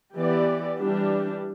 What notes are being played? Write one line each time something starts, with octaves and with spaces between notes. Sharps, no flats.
E3 B3 G4 D5
E3 G3 D4 G4